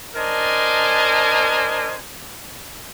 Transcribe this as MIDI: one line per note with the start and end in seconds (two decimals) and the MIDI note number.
0.15 1.96 62
0.15 1.96 70
0.15 1.96 72
0.15 1.96 75
0.15 1.96 80
0.15 1.96 81